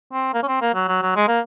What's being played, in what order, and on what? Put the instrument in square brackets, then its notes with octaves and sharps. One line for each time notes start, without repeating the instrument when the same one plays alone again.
[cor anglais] C4
A#3
C#4
C4
A#3
F#3
F#3
F#3
G#3
A#3